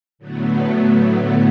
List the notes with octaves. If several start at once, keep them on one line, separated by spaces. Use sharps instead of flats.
A2 D3 F#3 A3 B3